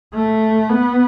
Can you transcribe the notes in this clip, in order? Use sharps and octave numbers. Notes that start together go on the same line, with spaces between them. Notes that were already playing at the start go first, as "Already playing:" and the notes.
A3
B3